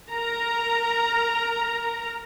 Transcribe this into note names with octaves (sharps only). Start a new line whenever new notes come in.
A#4 A#5